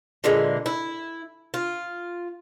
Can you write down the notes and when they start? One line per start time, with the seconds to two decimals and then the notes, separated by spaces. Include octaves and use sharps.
0.24 A#2 D3 E3 G#3
0.66 E4
1.54 F4